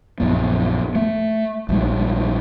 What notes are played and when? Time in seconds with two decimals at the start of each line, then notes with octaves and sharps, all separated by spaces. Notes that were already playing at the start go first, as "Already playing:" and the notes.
0.20 A#1 F#2 B3
0.95 A3
1.69 A#1 G#2 D#3 G3